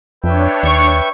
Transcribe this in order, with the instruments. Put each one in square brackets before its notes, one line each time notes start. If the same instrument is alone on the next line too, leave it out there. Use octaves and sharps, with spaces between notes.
[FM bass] F2 [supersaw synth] D4 C#5 [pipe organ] B4 E5 G5
[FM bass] D#2 [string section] C#6